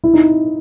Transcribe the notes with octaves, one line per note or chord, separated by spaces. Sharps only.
E4
D#4